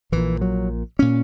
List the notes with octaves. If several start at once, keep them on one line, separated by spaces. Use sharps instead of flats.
A#1 A#2 E3
F#3
A#2 C#4